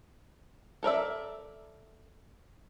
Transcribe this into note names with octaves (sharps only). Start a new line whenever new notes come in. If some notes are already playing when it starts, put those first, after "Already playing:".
A4 A#4 D5 E5